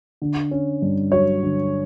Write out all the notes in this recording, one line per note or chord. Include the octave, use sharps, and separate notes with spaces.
D3
C#4
G2
F#3 C#5
D3